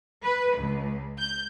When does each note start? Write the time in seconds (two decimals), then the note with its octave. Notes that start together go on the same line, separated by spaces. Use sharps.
0.25 B4
0.57 C#2
1.19 G6